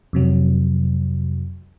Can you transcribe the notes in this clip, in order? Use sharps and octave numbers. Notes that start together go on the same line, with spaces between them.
F2 C3 F#3